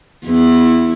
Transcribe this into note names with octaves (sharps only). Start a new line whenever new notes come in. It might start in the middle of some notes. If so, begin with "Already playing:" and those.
E2 E4